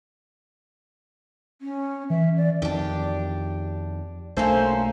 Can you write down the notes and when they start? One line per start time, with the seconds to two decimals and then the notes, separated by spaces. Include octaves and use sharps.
1.62 C#4
2.10 E3 E5
2.37 D5
2.62 F2 D#3 D4 G4
4.37 B1 A3 A#3 C#4 D4 A4 C5